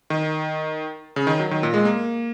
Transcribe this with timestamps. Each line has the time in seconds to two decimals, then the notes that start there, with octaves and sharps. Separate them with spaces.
0.10 D#3
1.16 C#3
1.27 D#3
1.40 F#3
1.51 D#3
1.63 A#2
1.74 G#3
1.85 A#3